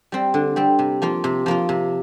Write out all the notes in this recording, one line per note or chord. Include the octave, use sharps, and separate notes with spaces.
G3 C4
D3
G3 C4
C3
F3 A#3 F4
C3
F3 A#3 F4
C3